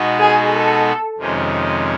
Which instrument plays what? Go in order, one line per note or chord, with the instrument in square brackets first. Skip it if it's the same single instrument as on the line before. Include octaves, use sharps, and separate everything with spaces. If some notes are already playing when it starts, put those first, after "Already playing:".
Already playing: [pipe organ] B2 G#3 B3 D#4 F#4
[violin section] G#4
A4
[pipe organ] F2 C3 D#3 G#3 C#4